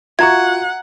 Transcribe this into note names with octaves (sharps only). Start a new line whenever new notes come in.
F4 F#4 E5 F#5 A#5 C#6 G#6